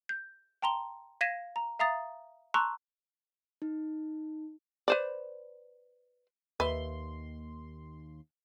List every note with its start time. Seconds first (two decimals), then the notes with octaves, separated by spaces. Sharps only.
0.09 G6
0.62 G5 A5 A#5 C6 G7
1.21 F5 G#6 A#6 B6 D#7 E7
1.56 A#5
1.79 E5 F5 A#5 D#6 A6
2.54 A5 A#5 C6 C#6 E6 F#6
3.62 D#4
4.88 B4 C5 D5
6.60 D#2 B4 E5 C6